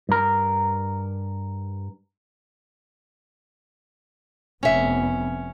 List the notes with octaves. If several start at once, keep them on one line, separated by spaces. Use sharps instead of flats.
G2 A#4
F1 F2 B3 C#4 E5